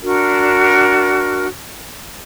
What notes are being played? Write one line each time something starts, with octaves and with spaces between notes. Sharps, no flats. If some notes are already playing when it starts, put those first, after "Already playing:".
D4 F#4 A#4